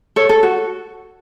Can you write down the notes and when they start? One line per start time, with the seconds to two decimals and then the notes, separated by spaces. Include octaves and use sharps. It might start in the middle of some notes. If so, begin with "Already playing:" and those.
0.16 A4 C#5
0.29 A4
0.43 F#4